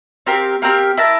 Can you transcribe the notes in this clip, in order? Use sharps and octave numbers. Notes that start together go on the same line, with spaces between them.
C4 G4 A#4 F5
C4 G4 A#4 F5
E4 A#4 E5 A5